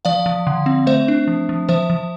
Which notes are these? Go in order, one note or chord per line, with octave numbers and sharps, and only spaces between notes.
F3 D5 F5
F3
D3
C4
A3 C5 E5
D4
F3
F3
F3 C5 E5
F3